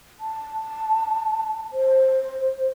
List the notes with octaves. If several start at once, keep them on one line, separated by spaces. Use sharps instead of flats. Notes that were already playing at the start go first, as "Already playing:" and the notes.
A5
C5